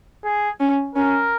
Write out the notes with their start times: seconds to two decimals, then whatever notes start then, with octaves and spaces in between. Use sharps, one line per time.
0.25 G#4
0.60 C#4
0.95 C#4 A#4